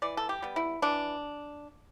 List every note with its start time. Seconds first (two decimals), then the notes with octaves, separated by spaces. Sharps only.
0.02 E3 D5
0.17 A4
0.29 G4
0.42 G3 B3
0.56 E4
0.82 E3 D4